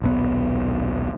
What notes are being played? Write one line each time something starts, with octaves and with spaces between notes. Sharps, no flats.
D#1 B1 B3